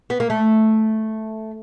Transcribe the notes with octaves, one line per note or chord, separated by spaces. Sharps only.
B3
A#3
A3